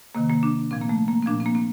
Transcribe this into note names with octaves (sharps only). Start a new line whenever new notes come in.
C3 D#3 A#3
A#3
D4
A#2 F3 C4
A#3
A3
A#3
C4
A#2 F3 D4
C4
A#3
C4